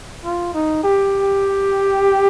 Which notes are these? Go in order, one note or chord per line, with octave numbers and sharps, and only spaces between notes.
F4
D#4
G4